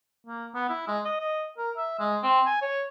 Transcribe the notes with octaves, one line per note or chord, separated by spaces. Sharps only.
A#3
B3
E4
G#3
D#5
D#5
A#4
E5
G#3
C4
G#5
C#5